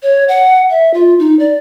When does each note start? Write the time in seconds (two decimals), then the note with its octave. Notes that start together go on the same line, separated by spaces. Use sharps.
0.03 C#5
0.28 F#5
0.70 E5
0.94 F4
1.19 D#4
1.39 D5